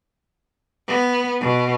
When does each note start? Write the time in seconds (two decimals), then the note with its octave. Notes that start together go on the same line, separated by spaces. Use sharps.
0.88 B3
1.41 B2